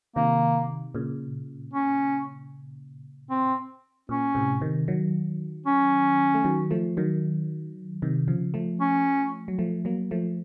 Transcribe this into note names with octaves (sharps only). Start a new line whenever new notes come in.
C3 D#3 A#3
A#2 C#3
C#4
C4
A#2 C#4
A2 C3
C3 D#3
D#3 F#3
C#4
A3
D#3 F#3
F3 A3
D#3 F#3
C3 D#3
C#3 F3
F3 A3
C#4
F#3
F3 A3
F#3 A#3
F3 A3